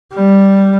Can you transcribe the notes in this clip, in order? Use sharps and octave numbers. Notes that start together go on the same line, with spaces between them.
G3